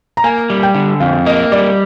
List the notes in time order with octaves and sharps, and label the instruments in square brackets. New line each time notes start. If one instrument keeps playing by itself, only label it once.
[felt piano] A#5
[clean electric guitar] A#3 [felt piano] G#5
[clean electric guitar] G3
[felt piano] G5
[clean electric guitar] D3
[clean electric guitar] F2 [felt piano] F5
[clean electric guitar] A#3 [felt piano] D#5
[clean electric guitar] G3 [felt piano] D5